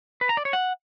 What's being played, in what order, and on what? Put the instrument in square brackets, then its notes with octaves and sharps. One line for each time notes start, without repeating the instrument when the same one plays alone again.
[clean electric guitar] B4
A#5
D5
C#5
F#5